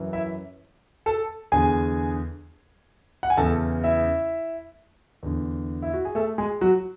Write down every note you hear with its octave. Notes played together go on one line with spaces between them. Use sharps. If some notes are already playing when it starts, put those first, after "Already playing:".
Already playing: F#2 E3
E4 E5
A4 A5
E2 D3 G#4 G#5
F#5
G#5
E2 C#3 E3 A4 A5
E4 E5
E2 D3
E4
F#4
G#4
A3 A4
G#3 G#4
F#3 F#4